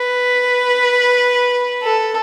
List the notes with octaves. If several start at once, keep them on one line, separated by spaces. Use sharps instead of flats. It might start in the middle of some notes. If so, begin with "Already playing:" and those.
Already playing: B4
A4